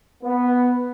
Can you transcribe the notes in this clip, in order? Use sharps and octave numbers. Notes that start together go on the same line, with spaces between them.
B3